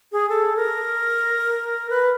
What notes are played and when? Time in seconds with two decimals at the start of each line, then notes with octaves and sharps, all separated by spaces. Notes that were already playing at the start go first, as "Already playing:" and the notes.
0.12 G#4
0.29 A4
0.56 A#4
1.90 B4